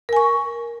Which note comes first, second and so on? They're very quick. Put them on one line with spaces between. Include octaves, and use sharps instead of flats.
A#4 G#5 C#6